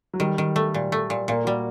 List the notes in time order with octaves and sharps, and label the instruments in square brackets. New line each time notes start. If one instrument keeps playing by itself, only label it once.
[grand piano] F#3
[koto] D#3 [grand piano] G3
[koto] D#3
A3
A#2
A3
A#2
[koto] A#2 [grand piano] A#3
[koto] G3 [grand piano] F#4